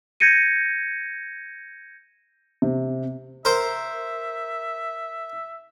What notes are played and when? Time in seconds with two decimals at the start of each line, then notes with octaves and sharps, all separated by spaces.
0.20 G6 G#6 A#6 C#7 D#7
2.62 C3
3.45 A#4 C5 E5